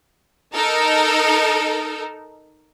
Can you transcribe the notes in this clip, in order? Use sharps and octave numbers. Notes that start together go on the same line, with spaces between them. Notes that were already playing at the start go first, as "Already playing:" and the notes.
D#4 A4 A#4